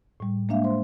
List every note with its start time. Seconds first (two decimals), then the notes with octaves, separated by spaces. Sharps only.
0.20 A2 G3
0.49 G#3 A#3 D4 E5 F5
0.64 C5 C6